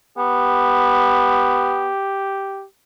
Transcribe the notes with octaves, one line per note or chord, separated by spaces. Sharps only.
B3 G4